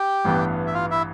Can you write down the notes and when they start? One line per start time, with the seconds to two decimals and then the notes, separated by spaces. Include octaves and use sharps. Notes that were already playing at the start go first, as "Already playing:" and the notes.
Already playing: G4 G5
0.25 A1 G2 E3 B3
0.67 E5
0.74 F4 F5
0.91 E4 E5